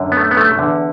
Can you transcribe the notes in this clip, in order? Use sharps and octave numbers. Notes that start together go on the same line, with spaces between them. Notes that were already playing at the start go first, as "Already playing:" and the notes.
Already playing: F#2 D3
B3
A3
B3
A3
E2 D3